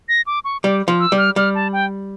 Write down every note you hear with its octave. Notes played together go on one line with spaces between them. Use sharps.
A#6
D6
C#6
G3 D6
F3
E6
G3
F6
G3 F6
A5
G5